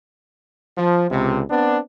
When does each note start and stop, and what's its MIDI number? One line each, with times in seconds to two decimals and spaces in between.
0.78 1.05 53
1.11 1.41 37
1.11 1.41 48
1.50 1.78 59
1.50 1.78 60
1.50 1.78 62